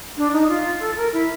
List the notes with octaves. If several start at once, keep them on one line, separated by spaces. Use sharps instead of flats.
D4
D#4
F4
A4
A#4
E4